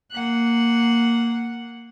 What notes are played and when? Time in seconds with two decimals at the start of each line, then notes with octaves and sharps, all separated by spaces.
0.12 A#3 F#5